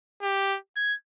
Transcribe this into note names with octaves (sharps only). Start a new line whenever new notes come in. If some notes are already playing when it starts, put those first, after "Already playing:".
G4
G#6